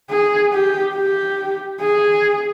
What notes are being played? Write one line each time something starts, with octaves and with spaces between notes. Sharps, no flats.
G#4
G4
G4
G#4